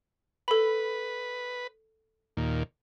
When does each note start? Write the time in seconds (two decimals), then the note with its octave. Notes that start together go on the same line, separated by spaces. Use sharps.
0.48 A4 B4 B5
2.37 D#2 A#2